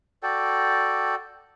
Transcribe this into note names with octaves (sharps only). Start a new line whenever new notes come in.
F#4 A4 D5 G5